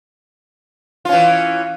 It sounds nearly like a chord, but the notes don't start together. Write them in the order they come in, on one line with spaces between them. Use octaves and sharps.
F4 C#4 E3